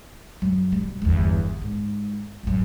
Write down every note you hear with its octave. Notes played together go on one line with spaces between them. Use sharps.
F#2
B2 G3
G1 E2
G#2
A1 F#2